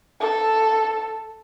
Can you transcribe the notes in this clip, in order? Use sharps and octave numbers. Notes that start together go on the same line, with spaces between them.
A4